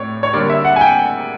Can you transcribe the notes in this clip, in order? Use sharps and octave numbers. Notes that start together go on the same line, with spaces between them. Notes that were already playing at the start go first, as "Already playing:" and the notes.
Already playing: A2 A3 C#5 D5
C#5
D3 G3 A#3 D5
E5
F#5
G#5
G5